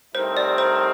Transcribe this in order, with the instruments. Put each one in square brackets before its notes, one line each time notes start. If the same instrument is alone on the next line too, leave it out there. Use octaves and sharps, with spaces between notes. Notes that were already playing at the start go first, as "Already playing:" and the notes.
[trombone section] A2 G3 C4 D#4 A#4 [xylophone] C5
[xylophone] D5
C5